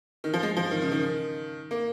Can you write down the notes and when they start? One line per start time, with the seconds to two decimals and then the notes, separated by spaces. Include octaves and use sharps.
0.24 D#3
0.34 F3
0.43 G#3
0.57 F3
0.71 D#3
0.82 C#3
0.92 D#3
1.71 A#3